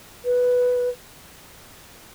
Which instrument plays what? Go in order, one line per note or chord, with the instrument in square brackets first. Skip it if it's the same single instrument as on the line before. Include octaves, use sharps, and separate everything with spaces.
[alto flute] B4